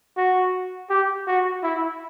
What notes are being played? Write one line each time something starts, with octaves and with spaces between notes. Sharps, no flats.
F#4
G4
F#4
E4